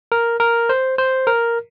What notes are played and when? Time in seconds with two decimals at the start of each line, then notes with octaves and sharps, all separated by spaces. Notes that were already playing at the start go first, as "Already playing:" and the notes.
0.12 A#4
0.40 A#4
0.69 C5
0.98 C5
1.27 A#4